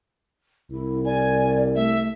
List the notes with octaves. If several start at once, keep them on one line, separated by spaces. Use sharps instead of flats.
C2 E4
D5 G#5
A3 E5